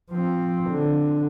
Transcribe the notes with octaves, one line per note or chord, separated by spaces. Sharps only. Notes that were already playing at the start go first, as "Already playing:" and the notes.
F3 C4
D3